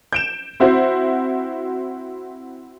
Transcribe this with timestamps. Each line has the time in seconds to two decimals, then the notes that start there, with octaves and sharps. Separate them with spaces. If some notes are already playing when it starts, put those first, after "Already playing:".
0.13 G6 D7 E7
0.60 C4 E4 F#4 C5